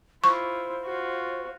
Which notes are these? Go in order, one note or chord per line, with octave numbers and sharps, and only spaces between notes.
E4 F4 C5 C#6
F4 F#4